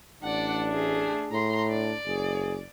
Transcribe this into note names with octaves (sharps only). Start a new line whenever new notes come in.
A1 D4 D5 F#5
A3 G#4
A2 A#5 C6
D4 D5
F#1 G#4